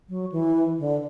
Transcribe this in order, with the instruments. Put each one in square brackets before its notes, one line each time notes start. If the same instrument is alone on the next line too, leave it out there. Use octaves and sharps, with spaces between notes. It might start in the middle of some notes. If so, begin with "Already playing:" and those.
[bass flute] F#3
E3
D3